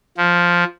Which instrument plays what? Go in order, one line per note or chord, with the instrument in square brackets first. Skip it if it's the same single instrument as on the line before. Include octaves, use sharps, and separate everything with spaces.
[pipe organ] F3